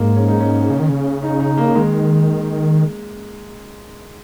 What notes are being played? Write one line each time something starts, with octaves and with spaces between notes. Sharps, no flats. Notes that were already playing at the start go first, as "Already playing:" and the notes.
Already playing: G#2 G#3 A#3
C#4
D#4
C#4
C#3
D#3
C#3
D#4
D#4
A#3
D#3 G#3